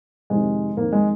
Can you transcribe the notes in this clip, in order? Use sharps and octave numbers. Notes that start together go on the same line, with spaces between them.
F2 C3 D#3 G#3
F2 D#3 A#3
G#3